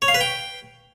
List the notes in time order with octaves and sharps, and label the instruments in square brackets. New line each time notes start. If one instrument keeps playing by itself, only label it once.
[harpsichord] C#5
F5
B4
G5